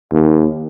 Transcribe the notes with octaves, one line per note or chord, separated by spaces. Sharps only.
D#2